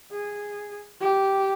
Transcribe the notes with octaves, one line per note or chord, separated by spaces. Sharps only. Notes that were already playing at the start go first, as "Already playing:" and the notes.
G#4
G4